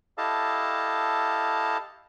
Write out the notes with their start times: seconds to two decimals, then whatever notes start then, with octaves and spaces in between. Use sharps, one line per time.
0.18 E4 G4 A4 D#5 F5 A5